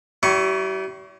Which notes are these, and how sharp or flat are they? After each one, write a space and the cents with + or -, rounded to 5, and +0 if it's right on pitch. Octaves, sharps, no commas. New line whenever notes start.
G3 -45 E4 +0 C#6 +0